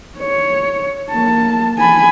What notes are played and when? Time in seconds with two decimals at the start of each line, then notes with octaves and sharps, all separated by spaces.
0.19 C#5
1.10 A#3 A5
1.78 G#5 B5